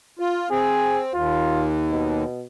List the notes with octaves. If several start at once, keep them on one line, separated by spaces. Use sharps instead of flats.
F4
C4 G#4
D#2 F4
B2